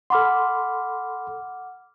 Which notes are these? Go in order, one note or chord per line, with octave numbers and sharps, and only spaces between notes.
A4 F#5 B5 C6 D6 F6